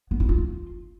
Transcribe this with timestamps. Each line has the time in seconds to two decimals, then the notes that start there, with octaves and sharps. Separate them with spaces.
0.11 B3
0.20 E4
0.29 F4